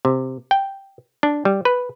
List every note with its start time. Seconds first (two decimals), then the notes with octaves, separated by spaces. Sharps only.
0.05 C3
0.51 G5
1.23 D4
1.45 G3
1.65 B4